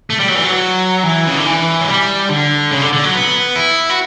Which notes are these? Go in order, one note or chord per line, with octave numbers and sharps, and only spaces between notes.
A3
G3
F#3
E3
F#3
E3
C#3
D3
E3
F#3
G3
D3
C#3
D3
D3
F#3
B3
E4
F#4